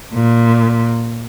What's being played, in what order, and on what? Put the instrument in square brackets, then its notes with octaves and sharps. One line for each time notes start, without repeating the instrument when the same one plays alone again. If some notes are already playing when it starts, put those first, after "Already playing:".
[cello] A#2